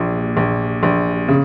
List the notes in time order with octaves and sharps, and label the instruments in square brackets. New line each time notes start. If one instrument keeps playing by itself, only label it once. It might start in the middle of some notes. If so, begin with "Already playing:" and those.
Already playing: [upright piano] A#1 A#2
A#1
A#1
C#3